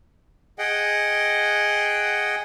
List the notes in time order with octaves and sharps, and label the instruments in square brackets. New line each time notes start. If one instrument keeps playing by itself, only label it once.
[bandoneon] G#4 D#5 F#5 G5